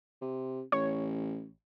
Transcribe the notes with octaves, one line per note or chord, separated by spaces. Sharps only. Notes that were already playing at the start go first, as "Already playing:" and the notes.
C3
A1 C#5